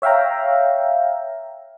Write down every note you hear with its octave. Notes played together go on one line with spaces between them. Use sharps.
C#5 E5 F5 G5 A#5